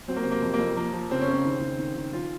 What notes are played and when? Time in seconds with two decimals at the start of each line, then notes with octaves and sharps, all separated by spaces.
0.08 F#3 C4
0.16 A#3
0.23 C3 C4
0.31 A#3
0.42 F2
0.54 A#3
0.59 F2
0.77 F3 A#3
0.93 F3
1.11 C#3 C4
1.21 C#4
1.28 C#3
1.33 C4
1.45 D#3
1.61 D#3
1.78 D#3
1.96 D#3
2.12 F3 F4